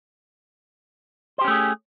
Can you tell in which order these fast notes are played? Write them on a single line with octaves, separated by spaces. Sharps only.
C5 G4 C#4 A3 G#4